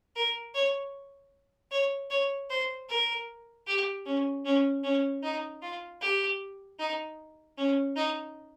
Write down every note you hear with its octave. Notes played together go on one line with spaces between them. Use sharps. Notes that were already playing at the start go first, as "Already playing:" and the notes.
A#4
C#5
C#5
C#5
C5
A#4
G4
C#4
C#4
C#4
D#4
F4
G4
D#4
C#4
D#4